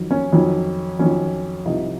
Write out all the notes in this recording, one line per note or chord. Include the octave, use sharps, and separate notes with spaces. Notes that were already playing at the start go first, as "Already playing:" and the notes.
Already playing: F2 D#3 F#3
C#4
F2 D#3 F#3
F2 D#3 F#3 C#4
C2 C3 F3 D#4